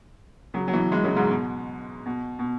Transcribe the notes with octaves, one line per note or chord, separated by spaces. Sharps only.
C#3 F#3
F#3
B2 E3
E3 G#3
C#3 F#3
G#2 C#3
B2
B2
B2